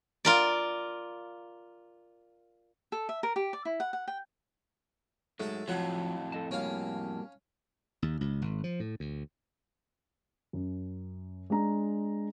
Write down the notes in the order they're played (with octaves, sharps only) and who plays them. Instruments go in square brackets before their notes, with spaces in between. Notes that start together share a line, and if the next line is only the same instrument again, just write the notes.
[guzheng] F4 A#4 D5
[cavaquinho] A4
E5
A#4
G4
D5
E4
F#5
F#5
G5
[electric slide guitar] G#2 F#3 G#3 [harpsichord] A3 A4
[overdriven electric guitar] F2 A2 [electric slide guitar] F3 [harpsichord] F#3 F#5
[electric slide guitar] A4 D#5 A5
[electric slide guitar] G3 A#3 F#4 [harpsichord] C#4 F5
[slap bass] D#2
C#2
G#1
F3
A2
D2
[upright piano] F#2
G#3 D4 A#5